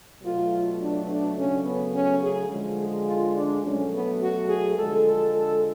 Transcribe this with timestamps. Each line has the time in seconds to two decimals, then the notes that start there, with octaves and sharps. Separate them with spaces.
0.22 B2 F#3 A3 F4
0.79 D4
1.07 D4
1.35 C#3 F#3 A3 C#4
1.64 B3
1.93 C#4
2.21 G#4
2.49 D3 F3 G#3
2.77 G#4
3.06 F4
3.34 D4
3.63 B2 F#3 A3 C#4
3.91 B3
4.19 F#4
4.48 G#4
4.76 D3 F3 G#3 A4
5.05 A4
5.33 A4